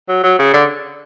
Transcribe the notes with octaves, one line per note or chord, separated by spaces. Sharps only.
F#3
F#3
C#3
D3